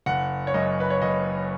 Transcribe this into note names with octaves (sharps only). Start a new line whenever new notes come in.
F#1 F#5
C#5
F#2 D#5
B4
C#5
F#1 D#5